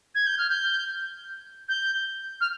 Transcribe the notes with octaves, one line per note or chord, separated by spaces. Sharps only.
G#6
G6
F6
G6
G6
F6